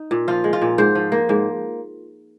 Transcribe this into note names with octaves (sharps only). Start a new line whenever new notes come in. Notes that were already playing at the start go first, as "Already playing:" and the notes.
Already playing: D#4
A#2
F3 F4
G#3
F4
A#2
G#2 C5
F3
A#3
G#2